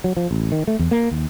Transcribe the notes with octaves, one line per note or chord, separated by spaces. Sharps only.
F#3
F3
A1
D#3
A3
E2
A#3
D#2